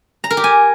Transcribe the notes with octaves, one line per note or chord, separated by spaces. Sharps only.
A#5
A#4
G4
G#5